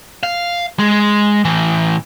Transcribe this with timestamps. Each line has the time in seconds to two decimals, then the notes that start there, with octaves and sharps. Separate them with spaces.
0.23 F5
0.79 G#3
1.45 A2 E3